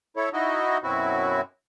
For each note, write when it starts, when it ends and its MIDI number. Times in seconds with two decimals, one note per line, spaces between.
0.17 0.29 64
0.17 0.29 69
0.17 0.29 73
0.33 0.78 63
0.33 0.78 64
0.33 0.78 66
0.33 0.78 75
0.83 1.41 42
0.83 1.41 47
0.83 1.41 54
0.83 1.41 60
0.83 1.41 64
0.83 1.41 66